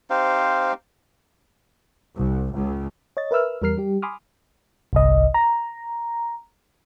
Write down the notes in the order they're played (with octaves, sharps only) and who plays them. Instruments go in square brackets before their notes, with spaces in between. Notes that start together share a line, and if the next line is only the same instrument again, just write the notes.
[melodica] C4 D#4 G4 [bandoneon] C5 F5
[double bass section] C2
C#2
[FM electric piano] C#5 D#5 A6
A#4 B4 E5 E6 F6
E2 G3 A#4 F6 C7
G3 G4
G#5 B5 C6 D6 D#6 F6
G1 C2 D#5
A#5